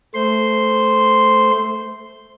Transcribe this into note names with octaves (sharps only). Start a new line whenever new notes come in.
A3 C5 C6